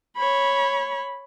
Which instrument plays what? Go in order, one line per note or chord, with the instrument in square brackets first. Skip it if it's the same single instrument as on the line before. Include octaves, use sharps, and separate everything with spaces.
[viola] C#5 B5